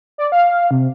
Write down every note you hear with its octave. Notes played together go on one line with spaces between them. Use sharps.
D5
F5
C3